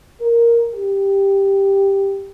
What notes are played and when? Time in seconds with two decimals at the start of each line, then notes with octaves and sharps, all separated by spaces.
0.19 A#4
0.75 G4